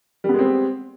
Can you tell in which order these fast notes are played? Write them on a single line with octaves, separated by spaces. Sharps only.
G3 B3 G#3 C4